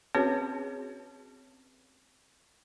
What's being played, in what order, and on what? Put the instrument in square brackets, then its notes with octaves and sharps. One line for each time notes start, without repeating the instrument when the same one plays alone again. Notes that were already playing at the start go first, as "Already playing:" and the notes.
[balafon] C4 C#4 F#4 G#4 B4 C#5